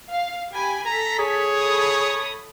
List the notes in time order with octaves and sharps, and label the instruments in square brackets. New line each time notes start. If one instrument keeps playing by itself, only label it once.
[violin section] F5
G4 G#5 B5
[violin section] A4 B6 [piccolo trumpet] A#5
[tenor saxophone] G#4 [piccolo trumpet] C#5
[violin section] A4 B5 D#6